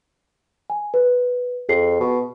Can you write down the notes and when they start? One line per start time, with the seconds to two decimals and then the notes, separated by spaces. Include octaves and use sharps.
0.70 G#5
0.94 B4
1.69 F2 G#4 C7
2.00 B2